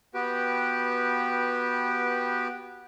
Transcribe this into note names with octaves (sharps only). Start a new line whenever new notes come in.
B3 F#4 G4 B4 G5